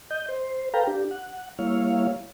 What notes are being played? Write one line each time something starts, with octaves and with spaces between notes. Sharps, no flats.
D#5 G6
C5
A4 B4 F5 G5 A#5
D4 G4
F#5
G3 A#3 E4 C#5 F5